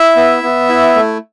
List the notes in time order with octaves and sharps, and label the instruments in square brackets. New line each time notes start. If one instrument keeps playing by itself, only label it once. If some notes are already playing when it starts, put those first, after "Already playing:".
Already playing: [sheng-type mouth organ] E4 E5
B3
B3
E4
A3